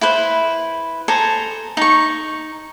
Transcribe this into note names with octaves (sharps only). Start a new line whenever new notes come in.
E4 B4 C5
A4 C5 G#5 A#5
D#4 C#6